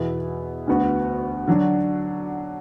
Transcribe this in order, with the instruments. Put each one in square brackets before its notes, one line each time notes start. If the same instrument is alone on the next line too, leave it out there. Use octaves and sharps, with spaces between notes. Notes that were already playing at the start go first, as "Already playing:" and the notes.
Already playing: [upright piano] E2 B2 B3 E4
D2 D3 B3 F#4
D3 F#3 D4 F#4